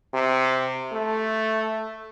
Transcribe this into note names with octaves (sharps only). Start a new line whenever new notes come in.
C3
A3